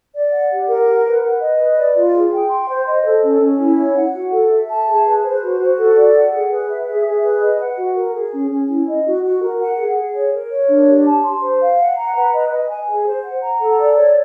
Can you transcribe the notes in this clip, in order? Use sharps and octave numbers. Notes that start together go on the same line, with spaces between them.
D5
F#5
G4
A#4
F#5
B4
B4
D#5
B4
D5
F4
G#4
G5
C6
C5
D#5
A4
C#4
C#4
E4
C#5
F#5
F#4
A4
E5
A5
G#4
B4
C5
F#4
F#4
A4
D5
F#5
G#4
B4
E5
G#4
G#4
B4
D#5
F#5
F#4
A#4
G#4
C#4
C#4
E4
D#5
F#4
F#4
A#4
F#5
G#4
G#4
C#5
A#4
C#5
D4
G4
A5
C6
C5
F5
F#5
A#5
B4
D#5
D#5
G#5
G#4
C5
F#5
A#5
A4
D5
C#5